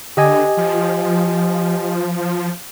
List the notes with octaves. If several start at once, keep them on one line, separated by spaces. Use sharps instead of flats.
D3 G4 D#5 G#5
F3